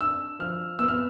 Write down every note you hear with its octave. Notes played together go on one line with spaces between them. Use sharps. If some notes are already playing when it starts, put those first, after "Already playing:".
D4 E6
F3 F6
B3 E6
F6